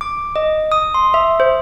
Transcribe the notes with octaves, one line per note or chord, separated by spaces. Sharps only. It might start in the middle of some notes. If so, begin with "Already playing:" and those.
D6
D#5
D#6
C6
E5
C5